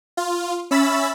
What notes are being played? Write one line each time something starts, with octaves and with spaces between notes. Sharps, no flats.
F4
C#4 E5 B5 E6 A6 B6